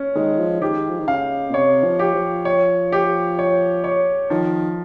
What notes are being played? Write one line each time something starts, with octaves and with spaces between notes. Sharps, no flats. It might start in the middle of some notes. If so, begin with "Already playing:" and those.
Already playing: C#4
D#3 G#3
F3
D#3 G4
F3
D#3
C#3 F5
A#2
C3 C#5
F3
G4
F3
C#5
G4
C#5
C#5
D#3 F3